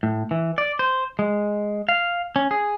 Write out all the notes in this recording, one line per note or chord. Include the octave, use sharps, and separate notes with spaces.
A2
E3
D5
C5
G#3
F5
C#4
G#4